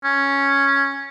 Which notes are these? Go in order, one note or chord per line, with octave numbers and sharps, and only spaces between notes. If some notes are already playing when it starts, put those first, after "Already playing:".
C#4